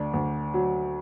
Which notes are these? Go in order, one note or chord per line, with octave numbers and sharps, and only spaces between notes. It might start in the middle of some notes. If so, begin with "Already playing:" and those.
Already playing: D2 D4
D2
F#3